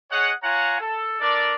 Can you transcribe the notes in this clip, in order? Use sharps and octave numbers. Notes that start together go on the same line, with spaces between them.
G#4 C#5 D#5 F#5
F4 C#5 F5 F#5 G#5 A#5
A4
D4 A4 A#4 D5